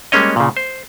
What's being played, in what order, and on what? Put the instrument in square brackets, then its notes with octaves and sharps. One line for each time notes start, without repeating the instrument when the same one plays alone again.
[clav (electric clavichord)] G3 G#3 A#3 C#4 C#5 D#5
A#2 C#3
C5